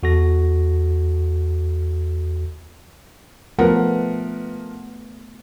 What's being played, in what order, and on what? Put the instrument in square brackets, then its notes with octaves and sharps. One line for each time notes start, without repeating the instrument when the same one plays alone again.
[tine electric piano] E2 F#4 A4 A#6
[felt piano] F3 A#4 F#5 [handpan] A3 B3 B4